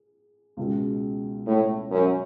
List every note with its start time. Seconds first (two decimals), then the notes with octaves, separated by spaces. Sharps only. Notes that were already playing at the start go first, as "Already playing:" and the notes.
Already playing: G#4
0.57 C#2 B2 G#3
1.47 A2
1.91 F#2